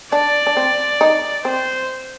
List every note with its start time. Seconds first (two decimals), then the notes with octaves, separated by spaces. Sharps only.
0.12 D4 D5
0.47 D4
0.57 C4
1.01 D#4
1.45 C4 C5